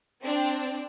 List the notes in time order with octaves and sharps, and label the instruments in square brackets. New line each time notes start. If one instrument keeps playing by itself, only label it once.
[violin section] C4 D4